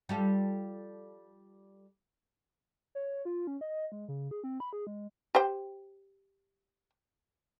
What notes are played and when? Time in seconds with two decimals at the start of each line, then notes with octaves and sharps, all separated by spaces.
0.09 G3 F4 A4
2.95 C#5
3.25 F4
3.47 C#4
3.61 D#5
3.92 G#3
4.08 C#3
4.31 G#4
4.44 C4
4.60 B5
4.73 G#4
4.87 G#3
5.35 G4 C5 G5